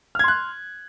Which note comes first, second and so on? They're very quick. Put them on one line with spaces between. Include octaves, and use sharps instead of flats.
F6 G#6 C6 F#6